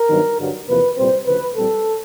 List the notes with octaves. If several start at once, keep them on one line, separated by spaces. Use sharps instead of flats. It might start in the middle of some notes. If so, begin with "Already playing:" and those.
Already playing: A#4
G2 D#3 F#3 B3
G2 D3 F#3
E2 C3 F3 A#3 B4
C2 A#2 G3 C4 C5
D2 C#3 F3 B4
A#1 A#2 G3 C4 A4